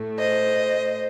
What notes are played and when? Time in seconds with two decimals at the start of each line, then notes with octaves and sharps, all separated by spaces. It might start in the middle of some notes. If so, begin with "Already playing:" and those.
Already playing: A2 A3
0.18 C5 D#5